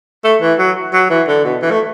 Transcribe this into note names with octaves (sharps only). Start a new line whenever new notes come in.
A3
E3
F#3
F#3
E3
D3
B2
E3
A3